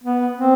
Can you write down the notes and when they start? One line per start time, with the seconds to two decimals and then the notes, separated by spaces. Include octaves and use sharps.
0.04 B3
0.37 C4